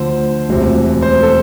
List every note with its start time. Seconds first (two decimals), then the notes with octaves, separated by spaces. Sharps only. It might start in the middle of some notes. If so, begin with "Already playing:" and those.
Already playing: D2 D3 F3 C5
0.49 E1 D2 C3 F3
1.02 C5
1.23 A4